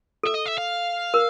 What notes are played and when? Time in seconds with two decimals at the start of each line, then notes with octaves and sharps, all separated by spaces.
0.23 A4 E5
0.35 D#5
0.46 E5
0.58 F5
1.14 A#4